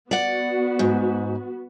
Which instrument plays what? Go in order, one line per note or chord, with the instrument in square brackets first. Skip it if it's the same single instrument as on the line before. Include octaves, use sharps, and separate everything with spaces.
[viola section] B3 F#4 [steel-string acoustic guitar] D5 F#5
[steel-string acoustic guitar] G#2